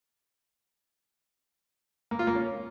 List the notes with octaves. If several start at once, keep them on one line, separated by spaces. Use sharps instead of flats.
A#3
F4
A#3
C#4